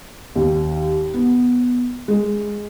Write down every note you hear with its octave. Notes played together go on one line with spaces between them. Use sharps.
D#2
B3
G#3